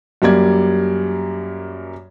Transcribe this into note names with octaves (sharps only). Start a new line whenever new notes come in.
F#2 G3 A#3 D5 G#6